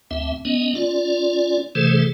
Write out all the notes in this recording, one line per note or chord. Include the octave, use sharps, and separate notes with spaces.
D2 C4 E5
B3 C#4 D#5
C#4 F4 D5
C3 E3 A3 G#4 A4 C5